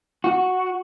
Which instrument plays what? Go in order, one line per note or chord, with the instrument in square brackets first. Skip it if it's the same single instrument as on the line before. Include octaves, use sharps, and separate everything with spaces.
[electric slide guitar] F#4